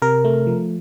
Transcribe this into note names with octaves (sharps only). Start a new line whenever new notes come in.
C3 A#4
A3
F3